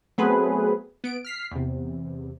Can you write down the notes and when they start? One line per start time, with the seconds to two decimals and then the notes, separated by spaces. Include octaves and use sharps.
0.18 F#3 A3 B3 C4 G#4 B4
1.04 B3 D7
1.25 F6 B6 C7
1.51 E2 C3